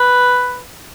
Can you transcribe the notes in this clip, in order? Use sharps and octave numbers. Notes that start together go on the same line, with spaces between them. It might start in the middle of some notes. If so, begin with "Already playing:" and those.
Already playing: B4